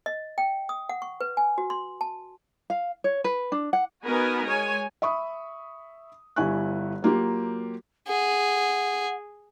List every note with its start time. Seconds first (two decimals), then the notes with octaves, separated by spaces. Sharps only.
0.06 D#5
0.38 G5
0.69 D#6
0.89 F#5
1.02 C#6
1.21 B4
1.37 G#5
1.58 F#4
1.70 C6
2.01 A5
2.70 F5
3.04 C#5
3.24 B4
3.52 D4
3.73 F#5
4.05 B3 D#4 F#4 A#4 B4 G#5
4.46 G#3 C#5 G#5
5.02 E5 B5 C#6 D#6
6.36 G1 G2 E4 G#5 C#6 F#6
7.02 F#3 A#3 F4 G4
8.08 G#4 F#5